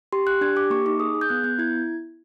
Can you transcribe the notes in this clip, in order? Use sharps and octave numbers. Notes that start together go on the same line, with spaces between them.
G4 C6
G4 F#6
D4 G#6
G4 D6
A#3 C#6
D#4 D6
G#4 D#6
G#4
G6
B3 F#6
B3 G6
E4 G#6